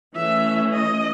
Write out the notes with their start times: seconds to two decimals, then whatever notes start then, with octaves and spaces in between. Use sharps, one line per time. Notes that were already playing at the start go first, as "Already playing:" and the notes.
0.13 E3 A3 C#4 E5
0.72 D#5